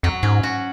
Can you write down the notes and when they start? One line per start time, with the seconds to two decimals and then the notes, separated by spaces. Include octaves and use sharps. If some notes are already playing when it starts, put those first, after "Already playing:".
0.03 F2 F#3
0.23 G#2 C#4
0.43 F#4